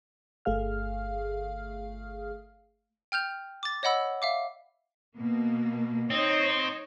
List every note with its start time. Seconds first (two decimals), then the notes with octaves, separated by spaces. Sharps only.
0.45 G1 A3 G#4 F5 F6
3.12 G5 F6 G6 F7
3.63 D6 A6
3.83 C#5 D#5 F#5 B5 E6
4.22 E5 F5 D6
5.16 B2 A#3
6.10 C4 D#4 C#5 D#5